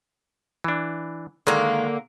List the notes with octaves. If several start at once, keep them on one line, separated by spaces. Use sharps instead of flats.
E3 D4
D3 D#3 G#3 A#3